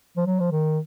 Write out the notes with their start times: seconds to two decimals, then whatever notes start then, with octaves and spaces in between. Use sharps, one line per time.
0.17 F3
0.26 F#3
0.40 F3
0.51 D#3